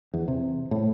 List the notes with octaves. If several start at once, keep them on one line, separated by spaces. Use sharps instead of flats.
E2
C3
A2